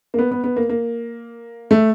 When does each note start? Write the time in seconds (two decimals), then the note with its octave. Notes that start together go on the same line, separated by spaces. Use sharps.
0.14 A#3
0.19 B3
0.31 B3
0.44 B3
0.56 A#3
0.69 A#3
1.71 A3